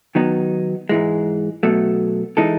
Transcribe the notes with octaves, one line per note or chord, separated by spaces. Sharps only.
D#3 F#3 B3 D#4
G#2 E3 G#3
B2 F#3 A3
E3 G#3 D#4 A4